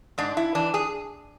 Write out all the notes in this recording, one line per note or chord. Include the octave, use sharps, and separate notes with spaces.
G#2 D4
E4
E3 D4
G#4